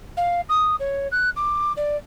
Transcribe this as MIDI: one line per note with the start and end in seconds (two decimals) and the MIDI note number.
0.17 0.41 77
0.49 0.75 87
0.80 1.08 73
1.12 1.30 90
1.36 1.72 86
1.77 1.96 74